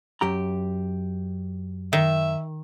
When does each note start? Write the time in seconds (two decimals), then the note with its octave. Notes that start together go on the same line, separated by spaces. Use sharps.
0.21 F#2 G4 A#5
1.93 D#3 E5